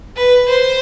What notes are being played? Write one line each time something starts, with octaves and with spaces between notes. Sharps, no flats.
B4
C5